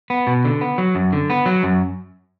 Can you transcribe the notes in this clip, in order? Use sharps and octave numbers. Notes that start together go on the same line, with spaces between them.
B3
B2
D3
B3
F#3
F#2
D3
B3
F#3
F#2